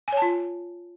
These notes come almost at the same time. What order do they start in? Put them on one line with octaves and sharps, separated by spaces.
G#5 C#5 A5 F4